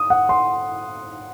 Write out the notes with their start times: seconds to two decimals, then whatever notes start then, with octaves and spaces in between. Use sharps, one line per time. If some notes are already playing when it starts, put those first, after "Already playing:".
Already playing: D#6
0.10 F#5
0.29 C6